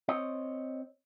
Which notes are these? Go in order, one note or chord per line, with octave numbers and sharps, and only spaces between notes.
C4 C#5 D#5